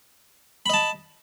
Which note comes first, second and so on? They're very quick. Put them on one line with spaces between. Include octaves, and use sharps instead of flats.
B5 D#5 A5